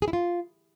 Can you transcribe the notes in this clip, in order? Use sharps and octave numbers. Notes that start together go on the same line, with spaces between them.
G#4
E4
F4